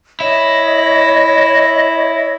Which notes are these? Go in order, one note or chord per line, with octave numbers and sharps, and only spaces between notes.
E4 C#5 D#5